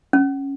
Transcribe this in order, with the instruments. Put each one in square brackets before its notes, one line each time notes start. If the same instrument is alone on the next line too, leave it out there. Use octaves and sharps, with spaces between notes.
[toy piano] C#4